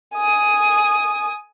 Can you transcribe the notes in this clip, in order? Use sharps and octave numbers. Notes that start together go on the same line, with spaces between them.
G#5 D#6